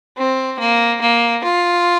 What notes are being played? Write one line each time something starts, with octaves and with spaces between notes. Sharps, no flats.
C4
A#3
A#3
F4